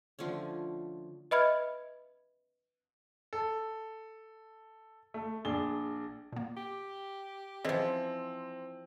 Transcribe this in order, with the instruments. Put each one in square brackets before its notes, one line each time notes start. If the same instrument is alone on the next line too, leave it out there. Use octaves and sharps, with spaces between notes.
[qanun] D3 F3 A3 C#4
[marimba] B4 D#5 E5 B5 F6 G#6
[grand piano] A4
A3
A#1 D4 G#4 G7
[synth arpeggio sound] A#2 A#3
[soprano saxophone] G4
[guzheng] E3 F3 [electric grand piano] C4 [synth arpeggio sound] G#4 C5 D#5